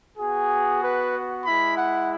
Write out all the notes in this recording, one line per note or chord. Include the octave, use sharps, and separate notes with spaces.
B3 F#4 G#4
B4
G#3 E4 B5
F#5